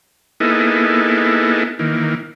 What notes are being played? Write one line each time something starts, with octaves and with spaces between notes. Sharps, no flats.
A#3 B3 D#4 E4 G#4 A4
D#3 E3 A#3